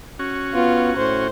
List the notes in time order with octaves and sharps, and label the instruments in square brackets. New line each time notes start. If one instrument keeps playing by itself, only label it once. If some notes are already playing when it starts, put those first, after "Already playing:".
[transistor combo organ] C#4 F#4
[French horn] B3 [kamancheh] F4
[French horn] A2 [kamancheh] C5